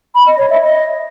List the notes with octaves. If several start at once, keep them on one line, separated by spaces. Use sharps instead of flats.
B5
D#5
C#5
E5
D#5